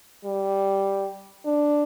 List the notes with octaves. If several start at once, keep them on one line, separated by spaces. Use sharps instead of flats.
G3
D4